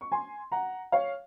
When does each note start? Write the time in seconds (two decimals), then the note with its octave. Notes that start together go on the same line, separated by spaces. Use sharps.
0.01 C#6
0.12 G#5 C6
0.52 F#5 A#5
0.92 C#5 F5